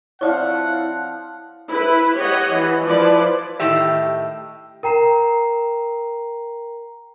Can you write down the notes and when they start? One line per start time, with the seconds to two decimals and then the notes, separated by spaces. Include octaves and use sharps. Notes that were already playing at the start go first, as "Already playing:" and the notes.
0.21 F3 C4 E4 F4 C#5 D5 F#5
1.71 E4 B4
2.18 G4 C#5 D#5 F#5
2.54 E3
2.85 F3 E4 B4 D5
3.60 A2 D#3 G4 E5
4.83 A#4 G5 A#5 C7 E7